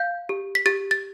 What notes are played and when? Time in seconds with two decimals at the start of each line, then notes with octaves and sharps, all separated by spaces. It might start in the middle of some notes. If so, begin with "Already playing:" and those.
Already playing: F5 G6
0.29 G4
0.55 B6
0.66 G4 A6
0.91 A6